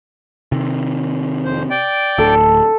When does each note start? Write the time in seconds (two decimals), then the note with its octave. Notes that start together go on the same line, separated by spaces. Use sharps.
0.52 C3 D#3
1.45 F2 C5
1.70 D5 G5
2.18 D1 D2 A4